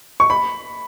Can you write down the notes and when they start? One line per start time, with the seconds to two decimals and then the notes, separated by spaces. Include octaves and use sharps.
0.20 C#6
0.30 B5